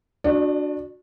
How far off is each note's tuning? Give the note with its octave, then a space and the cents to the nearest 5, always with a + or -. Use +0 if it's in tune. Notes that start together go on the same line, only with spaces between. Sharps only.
D4 +0 F#4 -20 D5 +40